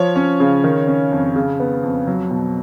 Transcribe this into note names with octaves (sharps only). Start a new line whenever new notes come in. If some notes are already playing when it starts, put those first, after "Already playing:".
Already playing: F3 C#5
C#4
C#3
D#3
C#4
F2
C#3
B3
F2
F#3
B2